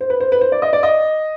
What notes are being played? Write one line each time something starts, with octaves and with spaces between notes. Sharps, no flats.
C5
B4
C5
B4
C5
D5
D#5
D5
D#5